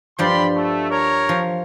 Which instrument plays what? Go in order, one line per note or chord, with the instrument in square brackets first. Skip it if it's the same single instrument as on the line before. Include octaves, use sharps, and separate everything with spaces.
[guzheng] G2 F3 D5 [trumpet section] G4 B5 C6
[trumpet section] A3
A#4 C#5
[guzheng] F3